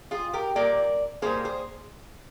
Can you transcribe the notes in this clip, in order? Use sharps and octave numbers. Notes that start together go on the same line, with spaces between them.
F4 G#4
G4 A#4
A#2 G3 A#3 A#4 D5
A#2 G3 A#3 G#4 C5
G#4 C5